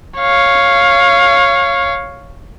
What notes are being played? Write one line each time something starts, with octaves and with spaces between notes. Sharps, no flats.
C#5 F5